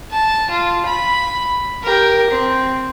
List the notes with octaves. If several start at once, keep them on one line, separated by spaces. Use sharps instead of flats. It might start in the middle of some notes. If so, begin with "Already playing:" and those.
A5
F4
B5
G4 A#4
C4